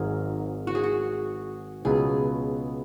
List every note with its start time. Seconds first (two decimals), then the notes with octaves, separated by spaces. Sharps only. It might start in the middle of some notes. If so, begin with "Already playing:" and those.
Already playing: G#1 G#2 F#3 G#4 A#4
0.67 F#4
0.75 G#4
0.83 F#4
1.85 C#2 B2 F#3 B3 G#4